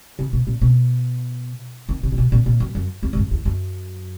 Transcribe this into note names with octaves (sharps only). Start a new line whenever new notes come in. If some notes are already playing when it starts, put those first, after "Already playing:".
C#3
B2
A#2
B2
D#3
C#3
A#2
B2
A#2
A#2
F#2
F#2
E2
G#2
F#2
E2
F#2